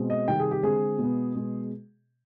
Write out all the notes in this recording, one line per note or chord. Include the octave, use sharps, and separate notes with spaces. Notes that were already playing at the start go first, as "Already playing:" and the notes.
Already playing: B2 G#3 C4
D#5
C3 D#3 G3 G5
G#4
G4
D3 G#3 C4 G#4
B2 G#3 B3
B2 G#3 B3